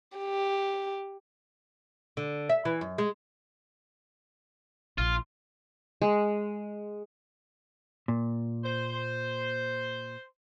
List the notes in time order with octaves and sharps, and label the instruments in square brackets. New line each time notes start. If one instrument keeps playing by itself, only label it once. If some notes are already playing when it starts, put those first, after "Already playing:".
[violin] G4
[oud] D3
E5
E3
F#2
G#3
[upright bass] A#1 [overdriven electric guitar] F4
[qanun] G#3
[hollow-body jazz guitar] A#2
[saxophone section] C5